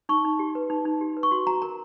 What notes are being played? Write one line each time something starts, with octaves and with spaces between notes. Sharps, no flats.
D#4 C#6
D#4
G4
B4
D#4
D#4
G4
B4
C#6
F#4 C6
F#4 A#5
A#4 A#5